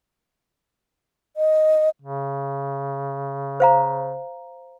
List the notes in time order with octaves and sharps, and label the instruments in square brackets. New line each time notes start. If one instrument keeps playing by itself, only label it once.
[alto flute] D#5
[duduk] C#3
[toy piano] C5 F5 A#5